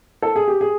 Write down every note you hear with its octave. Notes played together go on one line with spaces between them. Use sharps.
A4
G#4
G4
G#4